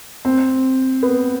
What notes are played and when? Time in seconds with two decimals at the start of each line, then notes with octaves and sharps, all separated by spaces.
0.25 C4
1.03 B3